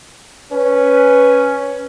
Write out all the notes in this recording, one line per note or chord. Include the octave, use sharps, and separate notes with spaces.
C#4 B4